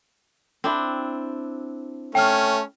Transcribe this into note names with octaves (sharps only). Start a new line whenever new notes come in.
C4 D4 E4
A3 C#4 G5 F6